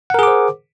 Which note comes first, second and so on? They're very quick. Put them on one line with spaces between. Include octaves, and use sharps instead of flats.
F#5 A#4 G#4 D6 C5